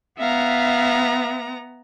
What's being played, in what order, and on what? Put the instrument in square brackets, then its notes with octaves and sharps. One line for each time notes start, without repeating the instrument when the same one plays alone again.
[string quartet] B3 A#5 [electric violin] E5 F5